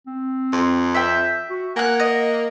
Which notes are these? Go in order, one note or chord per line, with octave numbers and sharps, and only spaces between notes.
C4
F2
E5 G5
F#4
A#3 F#5 G#5 F#6
D#5